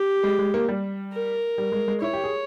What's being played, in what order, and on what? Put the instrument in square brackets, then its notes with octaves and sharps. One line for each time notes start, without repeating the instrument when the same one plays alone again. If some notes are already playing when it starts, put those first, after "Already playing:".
Already playing: [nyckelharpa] G4
[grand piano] G#3
G#3
A#3
G3
[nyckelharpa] A#4
[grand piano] G3
G#3
G#3
[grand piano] E4 [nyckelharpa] C#5
[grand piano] G4
G#4